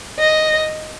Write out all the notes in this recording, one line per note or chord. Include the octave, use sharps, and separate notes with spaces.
D#5